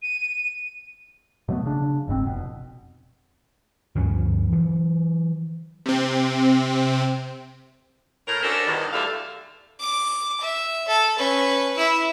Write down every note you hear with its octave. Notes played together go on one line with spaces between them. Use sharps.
D#7
B2 F#3 A3 B3
C#3 D4
F#1 G#2 C#3 C4
F1 B2
D2 G2 F3 C#4
E3 F#3
C3 C4
A2 A#4
C#4 D4 F#4 A4 A#4 C5
E2 G2 B2 D3 D#3
E2 D3 G3 A3 A4 F5
D6
E5
A4
C#4 B4
E4